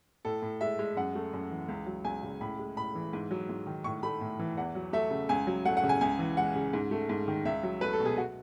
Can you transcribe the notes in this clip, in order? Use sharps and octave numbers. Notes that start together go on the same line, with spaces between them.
A2 A4
A2
G#3 E5
G#3
F#2 F#5
A3
F#2
E3
C#2
F#3
C#2 G#5
C#3
A2 B5
G#3
A2 B5
E3
G#2
F#3
G#2
D#3
A2 C#6
A3 B5
A2
E3
E2 F#5
F#3
A3 E5
C#3
C#2 G#5
F#3
A3 F#5
F#5
C#3
G#5
C#2 G#5
E3
G#3 F#5
C#3
G#2
A3
G#2
D#3
C#2 E5
F#3
A3 B4
A4
B2
G#4
F#4